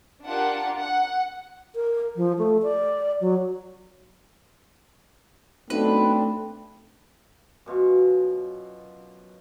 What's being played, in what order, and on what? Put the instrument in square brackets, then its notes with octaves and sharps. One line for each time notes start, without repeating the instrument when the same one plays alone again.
[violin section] D4 F4 G4 A#4 F#5
F#5
[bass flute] A#4
F3
A3
D5
F#3
[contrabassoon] B1 [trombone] A3 [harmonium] C4 D4 [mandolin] B4
[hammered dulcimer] F#2 B2 F4 C#6